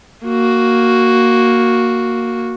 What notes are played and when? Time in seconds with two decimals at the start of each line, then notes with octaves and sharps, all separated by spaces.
0.25 A#3 F#4